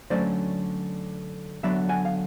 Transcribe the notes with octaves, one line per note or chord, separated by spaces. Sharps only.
D3 F#3 A3 C#4 C5 D5
D3 F#3 B3 D4 D5 E5
F#5 G#5
F5